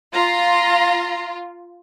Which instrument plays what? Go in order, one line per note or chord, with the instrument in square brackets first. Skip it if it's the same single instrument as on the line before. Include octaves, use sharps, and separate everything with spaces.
[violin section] F4 [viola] A#5 C6